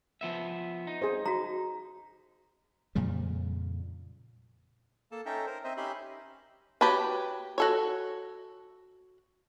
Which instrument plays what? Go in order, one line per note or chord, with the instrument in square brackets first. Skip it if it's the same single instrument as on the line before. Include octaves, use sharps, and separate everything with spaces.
[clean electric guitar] F3 B3 E5
D#4
[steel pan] G#4 C5
[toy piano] F#4 A#5
[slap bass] F2 A#2 C#3 G3
[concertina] A#3 A4 A5
C#4 D#4 A4 E5 G5 A#5
A#4 C5
C4 C5 D#5 E5
C#4 D#4 G4 E5 B5 C6
[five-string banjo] F#4 G4 B4 C#5 A5
F#4 A4 C#5